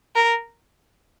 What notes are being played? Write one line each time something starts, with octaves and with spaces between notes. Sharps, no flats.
A#4